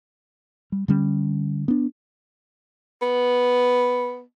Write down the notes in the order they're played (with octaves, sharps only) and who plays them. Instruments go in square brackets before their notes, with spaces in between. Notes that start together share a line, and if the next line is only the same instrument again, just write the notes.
[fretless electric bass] G3
D3 G3 C#4
B3 D4
[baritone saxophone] B3